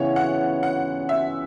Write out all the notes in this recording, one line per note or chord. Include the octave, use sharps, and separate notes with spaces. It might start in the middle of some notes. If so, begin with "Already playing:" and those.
Already playing: C#3 E3 B3 C#5
F#5
F#5
E5